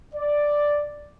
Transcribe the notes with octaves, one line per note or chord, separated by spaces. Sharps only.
D5